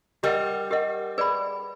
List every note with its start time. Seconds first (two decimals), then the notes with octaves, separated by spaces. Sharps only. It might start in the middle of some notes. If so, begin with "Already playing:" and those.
0.23 G3 G4 A#4 D#5 F#5
0.71 G4 A#4 D#5 F#5
1.18 G#4 B4 D5 G5 B5